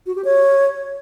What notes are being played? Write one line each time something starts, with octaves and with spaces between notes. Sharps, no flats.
F#4
G4
C#5